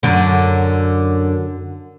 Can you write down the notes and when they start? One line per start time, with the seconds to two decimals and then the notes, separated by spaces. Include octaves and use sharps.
0.03 F#2 D3